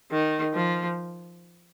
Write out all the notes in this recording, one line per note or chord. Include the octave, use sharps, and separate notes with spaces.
D#3
F3